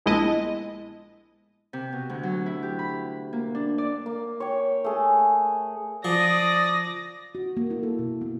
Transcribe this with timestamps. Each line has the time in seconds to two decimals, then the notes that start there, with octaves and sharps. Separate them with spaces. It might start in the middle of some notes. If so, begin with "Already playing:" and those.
0.06 A#1 G#3 B3 E4 D#5 A5
1.73 C3
1.93 B2
2.10 D2
2.23 F#3
2.46 E4
2.63 G4
2.79 B5
3.33 A#3
3.55 D4
3.78 D5
4.06 A#3
4.40 C#5 G5
4.84 A3 G#4
6.05 F3 D5 D#6 A#6
7.35 F#4
7.57 A#3
7.71 E4
7.83 A4
7.99 B2
8.21 B3